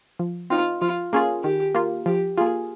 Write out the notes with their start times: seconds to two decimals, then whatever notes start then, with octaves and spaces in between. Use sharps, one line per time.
0.19 F3
0.50 C4 D#4 F4
0.81 F3 F4
1.13 A#3 C#4 F4 G#4
1.43 D#3 G4
1.75 A#3 F4
2.06 F3 G4
2.37 A#3 F4 G#4